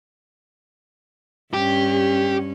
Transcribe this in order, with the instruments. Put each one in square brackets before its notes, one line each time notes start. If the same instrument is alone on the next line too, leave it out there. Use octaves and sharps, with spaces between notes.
[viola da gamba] G2 C#4 [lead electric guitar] G4